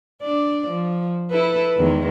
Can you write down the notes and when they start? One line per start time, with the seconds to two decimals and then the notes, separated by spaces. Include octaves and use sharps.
0.22 D4 D5
0.68 F3
1.30 E4 A4 B4
1.77 E2 D#3 G#3